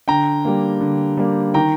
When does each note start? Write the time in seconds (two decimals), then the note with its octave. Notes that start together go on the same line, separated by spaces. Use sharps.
0.08 D3 G5 A#5
0.45 G3 A#3
0.81 D3
1.17 G3 A#3
1.54 D#3 G5 A#5